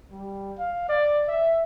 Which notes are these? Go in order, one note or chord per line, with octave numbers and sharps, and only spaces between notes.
G3
F5
D5
E5